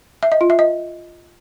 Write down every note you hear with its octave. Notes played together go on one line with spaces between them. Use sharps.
E5
D#5
F4
E5
D#5